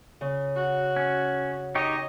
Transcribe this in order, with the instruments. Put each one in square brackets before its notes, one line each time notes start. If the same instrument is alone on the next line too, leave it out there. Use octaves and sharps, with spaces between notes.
[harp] C#3
[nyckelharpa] F#4
[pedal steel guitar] C#4
[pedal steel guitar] D#4 G4 C#5 [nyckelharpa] D#5